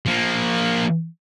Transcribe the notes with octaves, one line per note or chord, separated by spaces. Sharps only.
F3 A#3